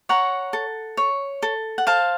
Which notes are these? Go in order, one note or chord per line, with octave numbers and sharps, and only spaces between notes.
C#5 F#5 A#5
A4
C#5
A4
F#5
C5 F5 A5